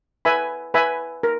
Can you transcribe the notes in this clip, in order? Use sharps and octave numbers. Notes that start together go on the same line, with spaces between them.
B4 E5 G#5 B5
B4 E5 G#5 B5
A#4